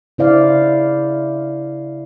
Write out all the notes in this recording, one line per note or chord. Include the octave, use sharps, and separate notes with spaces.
C#3 D4 E4 C5 D5 F5